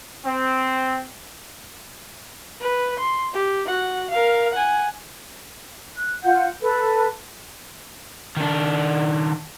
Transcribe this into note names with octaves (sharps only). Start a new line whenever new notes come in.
C4
B4
C6
G4
F#4 F#5
A#4 F5
F#5 G#5
F#6
F4 F#5 G6
A4 B4
D#3 D4